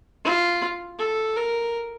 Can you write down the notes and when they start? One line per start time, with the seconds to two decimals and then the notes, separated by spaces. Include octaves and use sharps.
0.24 F4
0.99 A4
1.36 A#4